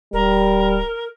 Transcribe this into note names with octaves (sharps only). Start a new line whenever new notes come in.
D1 G3 A#4